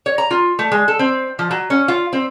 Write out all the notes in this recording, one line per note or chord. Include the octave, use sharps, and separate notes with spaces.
C#5
A#5
F4
A3
G#3
A4
C4
F3
F#3
C#4
F4
C4